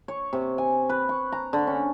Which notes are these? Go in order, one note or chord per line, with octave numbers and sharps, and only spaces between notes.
C#5
C3
G#5
B4
C#6
A#5
D3
C#4